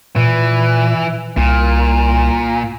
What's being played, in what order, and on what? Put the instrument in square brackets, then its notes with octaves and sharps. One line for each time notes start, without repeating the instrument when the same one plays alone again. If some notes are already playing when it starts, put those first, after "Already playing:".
[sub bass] A#2 [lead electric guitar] E3
[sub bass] C2 [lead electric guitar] A#2